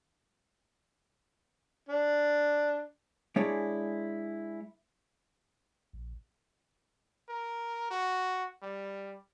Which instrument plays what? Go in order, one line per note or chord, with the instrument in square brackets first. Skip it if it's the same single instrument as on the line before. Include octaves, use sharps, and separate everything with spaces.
[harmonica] D4
[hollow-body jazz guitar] G#3 D4 E4 G#4 C#5 D5
[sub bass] A#1
[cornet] A#4
F#4
G3